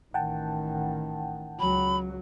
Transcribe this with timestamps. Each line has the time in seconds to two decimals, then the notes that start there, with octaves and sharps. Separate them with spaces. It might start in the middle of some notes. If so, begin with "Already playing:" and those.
0.14 A1 D#3 F#5 G5 A5
1.60 C#2 F#3 B5